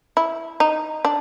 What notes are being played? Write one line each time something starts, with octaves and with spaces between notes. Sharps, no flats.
E4
D#4
D4